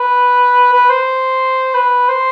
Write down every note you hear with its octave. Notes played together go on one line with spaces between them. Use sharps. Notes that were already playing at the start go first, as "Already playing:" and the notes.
Already playing: B4
B4
C5
B4
C5